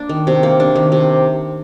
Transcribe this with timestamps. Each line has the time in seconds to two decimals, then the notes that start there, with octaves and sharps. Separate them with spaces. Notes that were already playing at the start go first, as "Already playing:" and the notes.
Already playing: A#3 D4
0.09 D#3
0.27 C3
0.43 A#3
0.60 D4
0.76 D#3
0.92 C3